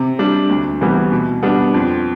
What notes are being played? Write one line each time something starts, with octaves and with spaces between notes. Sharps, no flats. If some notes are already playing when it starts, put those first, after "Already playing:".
Already playing: C3
G3 D4
D2
C3 E3 G3 B3
B2
G3 B3 D4
F2